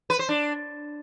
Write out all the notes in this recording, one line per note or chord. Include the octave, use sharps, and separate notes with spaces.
B4
C5
D4